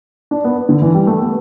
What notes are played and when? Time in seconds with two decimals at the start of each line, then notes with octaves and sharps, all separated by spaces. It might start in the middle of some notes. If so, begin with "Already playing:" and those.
0.31 D4
0.45 B3
0.69 D3
0.82 E3
0.94 G3
1.07 A3
1.20 B3